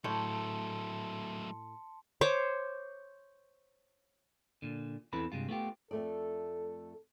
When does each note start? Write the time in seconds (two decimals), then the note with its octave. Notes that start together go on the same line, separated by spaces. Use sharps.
0.04 A2 F#3 A3 A5 C6 C#7
2.21 C5 C#5 D6
4.62 A#2 D3
5.13 E2 C4 E4 A4 B4 B5
5.32 G2 C3 G#3 F4
5.49 A3 B3 F4 G4
5.91 F2 A3 A4 D5